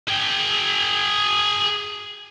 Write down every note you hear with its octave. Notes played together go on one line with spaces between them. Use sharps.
G#4 G5